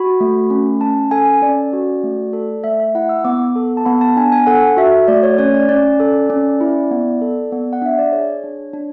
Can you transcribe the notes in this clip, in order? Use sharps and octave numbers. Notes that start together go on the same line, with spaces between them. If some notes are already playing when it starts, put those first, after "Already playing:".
Already playing: F#4 B5
A3
C#4
C#4 A5
A4 G#5
C#4 D5
F#4
A3
A4
A3 E5
E5
E4 F#5
E6
B3 D6
A4
A5
B3 B5
A5
D4 G#5
G#5
A4 F#5
F#4 E5
A3 D5
C#5
C#4 C#5
D5
C#4 D5
A4
C#4
E4
B3
A4
B3
F#5
D4 E5
D5
G#4 C#5
D4
D4